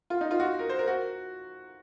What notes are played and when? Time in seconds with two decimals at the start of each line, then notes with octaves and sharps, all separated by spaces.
0.10 F4
0.21 D#4
0.31 F4
0.40 F#4
0.59 A#4
0.69 C5
0.79 A#4
0.88 F#4